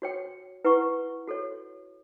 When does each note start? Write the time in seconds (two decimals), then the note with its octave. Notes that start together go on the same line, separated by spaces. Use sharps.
0.02 F#4 C#5 G5
0.65 E4 B4 F#5 C#6
1.28 F#4 A4 C#5